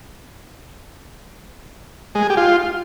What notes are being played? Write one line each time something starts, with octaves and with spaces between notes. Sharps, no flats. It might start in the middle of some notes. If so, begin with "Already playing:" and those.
G#3
G#4
G4
F4